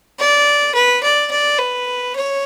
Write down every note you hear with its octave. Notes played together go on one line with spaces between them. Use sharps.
D5
B4
D5
D5
B4
C#5